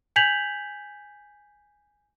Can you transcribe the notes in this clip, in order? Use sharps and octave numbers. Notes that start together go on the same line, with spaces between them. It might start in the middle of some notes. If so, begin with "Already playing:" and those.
G#5 G6 G#6 B6 F7 F#7